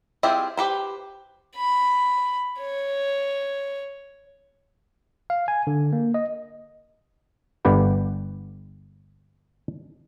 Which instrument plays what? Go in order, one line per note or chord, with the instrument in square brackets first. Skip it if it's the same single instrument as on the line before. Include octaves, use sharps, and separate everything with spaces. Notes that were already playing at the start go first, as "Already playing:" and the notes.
[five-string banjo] C4 E4 F4 G4 G#4
G4 B4 C5
[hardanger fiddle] B5
C#5
[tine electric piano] F5
G#5
D3
A#3
D#5
[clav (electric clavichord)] G1 D3 G4 B4 G5